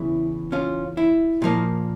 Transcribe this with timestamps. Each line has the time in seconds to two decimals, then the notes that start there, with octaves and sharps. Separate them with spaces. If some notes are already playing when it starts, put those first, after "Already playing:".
Already playing: E2 C#3 E3 E4
0.52 C#4 F4
0.97 E4
1.42 A#2 F3 A#3